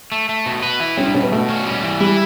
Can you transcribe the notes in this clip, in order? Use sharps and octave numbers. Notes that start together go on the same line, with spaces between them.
A3
A3
B2
B4
E4
G3 C#4
D4
B2 C#4
B3
B2 A3
C#4
G3
E3
G3 E4